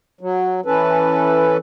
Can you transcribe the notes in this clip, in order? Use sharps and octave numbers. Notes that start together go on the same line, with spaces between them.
F#3
E3 C#4 A4 B4